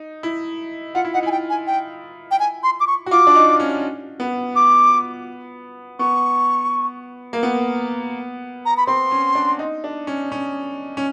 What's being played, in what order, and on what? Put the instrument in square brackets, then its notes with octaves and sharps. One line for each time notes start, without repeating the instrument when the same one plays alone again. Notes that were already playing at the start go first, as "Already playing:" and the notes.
Already playing: [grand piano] D#4
E4
[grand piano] F4 [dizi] F#5
[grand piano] E4
[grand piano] D#4 [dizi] F#5
[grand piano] E4 [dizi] G#5
[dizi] G5
G#5
G5
G5
G#5
C6
D6
C#6
[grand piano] F#4
[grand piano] F4 [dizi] D6
[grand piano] D4
D#4
C#4
B3
[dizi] D6
[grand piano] B3 [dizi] C#6
[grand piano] A#3
B3
[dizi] A#5
B5
[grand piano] C4 [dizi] C6
[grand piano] C#4
D4
D#4
D4
C#4
C#4
C#4